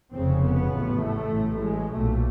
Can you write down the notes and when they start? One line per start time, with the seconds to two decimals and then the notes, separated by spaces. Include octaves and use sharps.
0.12 F1 F2 C#3 C4
0.42 B3
0.72 A1 A2
1.02 A3
1.33 A1 A2
1.63 G#3
1.93 B1 A#2 A3